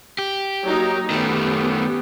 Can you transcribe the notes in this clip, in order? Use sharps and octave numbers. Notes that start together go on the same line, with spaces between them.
G4
F#3 A#3 D#4
D#3 A3 B3 C#4 G4